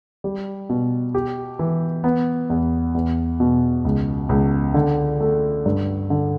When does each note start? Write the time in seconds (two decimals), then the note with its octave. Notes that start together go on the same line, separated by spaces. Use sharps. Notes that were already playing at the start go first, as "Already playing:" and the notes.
0.24 G3
0.69 B2
1.15 G4
1.59 E3
2.04 B3
2.50 E2
2.95 E2
3.40 B2
3.85 C#2
4.29 C#2
4.74 D3
5.20 A3
5.66 G2
6.10 D3